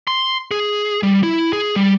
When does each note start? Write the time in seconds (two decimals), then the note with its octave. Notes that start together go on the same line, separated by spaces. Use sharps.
0.07 C6
0.51 G#4
1.03 G3
1.23 E4
1.53 G#4
1.76 G3